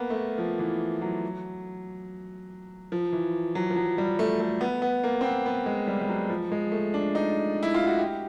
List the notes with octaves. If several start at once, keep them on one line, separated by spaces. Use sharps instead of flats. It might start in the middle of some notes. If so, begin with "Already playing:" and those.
Already playing: A#3 B3
A3
F3
E3
F#3
F3
E3
F#3
F3
F#3
G3
A3
A3
B3
B3
A#3
C4
B3
B3
G#3
G3
G3
F#3
F3
G#3
A3
D4
D#4
E4
F4
F#4
G4